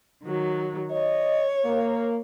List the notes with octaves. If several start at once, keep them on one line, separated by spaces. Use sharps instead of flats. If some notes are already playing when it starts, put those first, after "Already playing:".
D#3 F#3
C#5 D#5
A#3